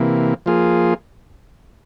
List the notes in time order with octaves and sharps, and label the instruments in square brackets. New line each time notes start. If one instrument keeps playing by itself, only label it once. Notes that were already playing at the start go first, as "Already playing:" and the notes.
Already playing: [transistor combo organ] C3 E3 A#3
F3 A#3 F4 G#4